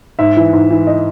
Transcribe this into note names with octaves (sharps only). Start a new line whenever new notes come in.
G#2 E5
E3
G#2
E3
D#5